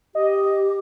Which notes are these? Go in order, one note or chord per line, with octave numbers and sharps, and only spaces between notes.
G4 D#5